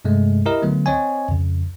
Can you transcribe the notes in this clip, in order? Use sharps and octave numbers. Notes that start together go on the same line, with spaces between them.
G2 C3 G#3 A3
E4 G4 A#4 D#5
D3 F#3 A3 B3
C4 C5 C#5 D#5 G#5
F2 C#3